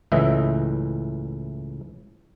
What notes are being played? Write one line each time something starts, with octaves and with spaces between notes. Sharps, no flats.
C#2 A2 E3 D#5 E5